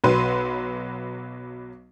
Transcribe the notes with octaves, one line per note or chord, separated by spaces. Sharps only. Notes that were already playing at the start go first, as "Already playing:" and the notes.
B1 F#3 B4 C6 D#7